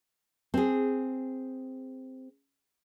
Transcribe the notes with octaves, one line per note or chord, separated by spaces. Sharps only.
C4 G#4